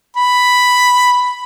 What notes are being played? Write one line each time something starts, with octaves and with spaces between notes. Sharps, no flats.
B5